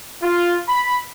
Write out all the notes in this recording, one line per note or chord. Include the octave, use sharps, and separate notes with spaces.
F4
B5